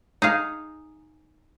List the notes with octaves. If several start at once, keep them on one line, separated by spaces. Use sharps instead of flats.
D#4 G#4 F5